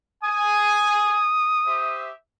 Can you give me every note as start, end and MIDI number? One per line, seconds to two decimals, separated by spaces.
0.24 1.21 80
0.24 2.11 87
1.67 2.11 67
1.67 2.11 72
1.67 2.11 76